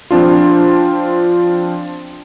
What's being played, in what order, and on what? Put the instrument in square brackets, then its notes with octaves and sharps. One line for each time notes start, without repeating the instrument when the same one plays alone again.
[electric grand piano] F3 C4 D4 F4